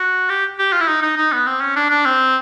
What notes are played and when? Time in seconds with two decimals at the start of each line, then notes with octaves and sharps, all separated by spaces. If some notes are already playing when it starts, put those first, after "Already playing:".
Already playing: F#4
0.30 G4
0.59 G4
0.73 F4
0.81 E4
0.88 D#4
1.02 D#4
1.17 D#4
1.32 B3
1.47 C4
1.61 C#4
1.76 D4
1.90 D4
2.05 C4